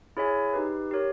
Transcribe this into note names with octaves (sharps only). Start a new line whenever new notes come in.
E4 G#4 C#5 E5 G#5
D#4 G4 B4
G4 A#4 C#5